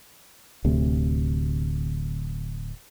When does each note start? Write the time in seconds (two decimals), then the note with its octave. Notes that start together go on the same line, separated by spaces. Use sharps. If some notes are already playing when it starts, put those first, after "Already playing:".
0.64 D1 D2 C3